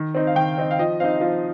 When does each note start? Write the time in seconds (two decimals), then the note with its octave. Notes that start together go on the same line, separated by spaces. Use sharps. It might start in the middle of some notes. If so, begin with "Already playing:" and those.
Already playing: D#3
0.15 C4 D#4
0.27 F5
0.35 D#3 G5
0.58 C4 D#4
0.71 F5
0.79 F3 D#5
1.00 C4 D#4 F5
1.21 F3 F5